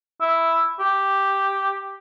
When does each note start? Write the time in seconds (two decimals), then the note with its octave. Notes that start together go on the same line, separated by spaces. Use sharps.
0.21 E4
0.80 G4